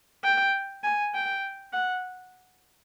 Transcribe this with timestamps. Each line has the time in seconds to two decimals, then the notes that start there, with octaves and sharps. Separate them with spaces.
0.24 G5
0.84 G#5
1.14 G5
1.73 F#5